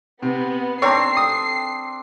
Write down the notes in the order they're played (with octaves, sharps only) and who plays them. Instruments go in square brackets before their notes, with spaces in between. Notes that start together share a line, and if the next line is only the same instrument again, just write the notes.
[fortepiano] C3 [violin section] B3
[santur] C4 D4 A4 [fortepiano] C#5 A#5 [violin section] C7
[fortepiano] D#6